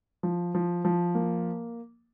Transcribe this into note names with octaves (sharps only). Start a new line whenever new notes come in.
F3
F3
F3
A#3